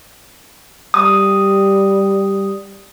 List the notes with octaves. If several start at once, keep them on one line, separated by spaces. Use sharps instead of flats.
G3 D#6